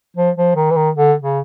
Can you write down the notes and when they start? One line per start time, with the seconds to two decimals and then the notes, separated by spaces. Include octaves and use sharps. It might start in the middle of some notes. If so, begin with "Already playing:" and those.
0.17 F3
0.37 F3
0.55 D#3
0.71 E3
0.76 D#3
0.95 D3
1.22 C#3